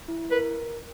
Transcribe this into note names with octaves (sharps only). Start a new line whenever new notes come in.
E4
A#4 B4